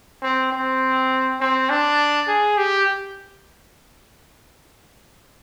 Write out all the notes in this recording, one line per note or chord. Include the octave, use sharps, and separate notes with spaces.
C4
C4
C4
D4
G#4
G4